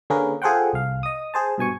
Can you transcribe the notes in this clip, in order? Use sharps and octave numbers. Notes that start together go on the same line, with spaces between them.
D3 A#3 C#4 G#4 A#4 B4
F4 G#4 A4 C5 F#5 G5
C2 F5
D#5 D#6
G#4 C5 A5
G2 B2 G#5 C#6